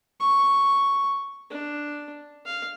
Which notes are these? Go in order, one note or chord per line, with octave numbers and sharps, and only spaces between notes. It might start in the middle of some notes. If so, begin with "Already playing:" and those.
C#6
D4
F5